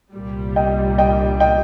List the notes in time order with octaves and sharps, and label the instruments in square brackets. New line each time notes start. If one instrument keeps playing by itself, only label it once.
[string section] C2 A#2 G3
[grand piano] D#5 G5
D#5 G5
D#5 G5